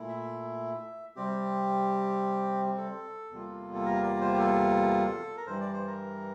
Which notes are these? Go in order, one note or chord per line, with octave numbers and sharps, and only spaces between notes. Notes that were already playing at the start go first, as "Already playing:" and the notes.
Already playing: A#2 A3 E4
E5
C3 G3 C4 G4
A4
E2 C3 G3 A#3 F4
A4
A#4
D5
C5
G4
A4
A#4
G2 E3 G3 C5
D5
C5
A#4